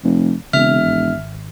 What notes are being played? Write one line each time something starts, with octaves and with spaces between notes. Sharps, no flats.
F1
E1 C#3 C4 E5 F6
G#1